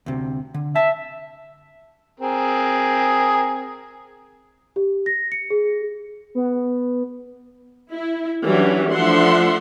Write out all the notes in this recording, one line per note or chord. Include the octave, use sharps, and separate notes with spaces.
D2 C3
D3
E5 A5
C4 G#4 A#4
G4
A#6
C#7
G#4
B3
E4
E3 F#3 G3 C#4 D4 F#4
F3 A3 D4 E5 F#5 C6